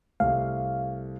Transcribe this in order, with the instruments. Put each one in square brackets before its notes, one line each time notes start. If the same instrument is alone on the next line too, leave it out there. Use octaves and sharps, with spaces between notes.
[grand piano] C2 A3 [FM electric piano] F5